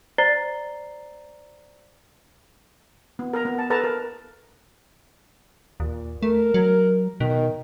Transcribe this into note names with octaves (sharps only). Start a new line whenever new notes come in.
C5 D5 A#5 A6 C7 G7
B3
A#4 A#5
B3
A5
A4 B4 A5 A#5
A#4
D#2 A#2
A3 A#4
F#3
B2 D#3